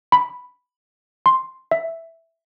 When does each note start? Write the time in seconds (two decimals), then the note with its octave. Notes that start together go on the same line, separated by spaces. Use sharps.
0.12 B5
1.26 C6
1.71 E5